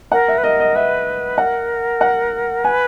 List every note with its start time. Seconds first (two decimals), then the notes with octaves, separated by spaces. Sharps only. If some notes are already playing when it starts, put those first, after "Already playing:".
0.12 A#4 F#5
0.28 E5
0.38 B4
0.43 A#4 D#5
0.60 D#5
0.75 B4 E5
1.38 A#4 F#5
2.01 F#5
2.64 B4 G#5